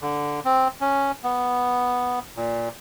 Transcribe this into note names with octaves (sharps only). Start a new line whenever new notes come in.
D3
C4
C#4
B3
A#2